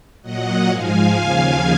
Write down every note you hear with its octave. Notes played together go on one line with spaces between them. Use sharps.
A#2 F#3 D#5 F#5
G#2 F3 G#3 F5 G#5
D#2 C#3 F3